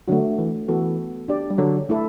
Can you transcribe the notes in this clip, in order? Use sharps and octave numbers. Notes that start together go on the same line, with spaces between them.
D3 F#3 A3 D4 F#4
E3
E3 B3 F#4 A4
D4 G4 D5
G3
D3 F#3
A3 E4 A4